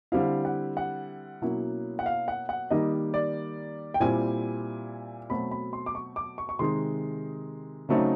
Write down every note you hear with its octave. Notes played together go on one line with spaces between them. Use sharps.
D3 G3 C4 E4 F5
F#5
F#5
B2 F#3 A#3 C#4 E4
F#5
F5
F#5
F#5
D#3 G3 A#3 D#4 D#5
D5
G5
A#2 G3 C4 E4 G#5
B2 F#3 A3 C4 B5
B5
C6
D6
C#6
D6
C#6
C#6
C3 D#3 G#3 C6
C#3 F#3 A3 C4 D#4